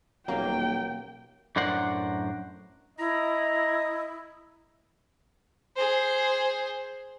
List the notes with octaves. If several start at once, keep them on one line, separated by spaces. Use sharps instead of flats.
D#1 B2 F#3 A#3 G5
F#2 A2 D4 A#4 C5 F#5
E4 D#5 A#5
G#4 C5